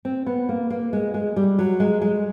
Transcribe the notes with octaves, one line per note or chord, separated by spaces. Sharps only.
C4
B3
A#3
A#3
G#3
G#3
G3
F#3
G#3
G#3